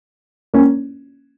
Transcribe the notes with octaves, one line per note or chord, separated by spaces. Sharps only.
A#3 C#4